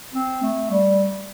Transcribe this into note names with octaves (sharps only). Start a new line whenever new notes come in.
C4
A3
G3